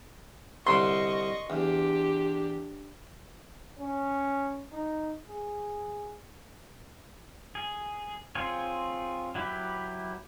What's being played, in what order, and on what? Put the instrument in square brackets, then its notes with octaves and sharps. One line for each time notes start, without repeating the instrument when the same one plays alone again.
[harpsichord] C2 D3 F#5 [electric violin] D#5 C#6 [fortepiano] C6
[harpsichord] E2 [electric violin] D4 G4
[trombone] C#4
D#4
G#4
[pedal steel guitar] G#4
C4 F4 G#4 C#5
F#3 E4 G4 B4